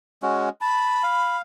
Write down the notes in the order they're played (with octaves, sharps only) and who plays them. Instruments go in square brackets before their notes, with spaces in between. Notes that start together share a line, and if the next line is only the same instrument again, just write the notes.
[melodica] G#3 C#4 F#4
[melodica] A5 [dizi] B5
[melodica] F5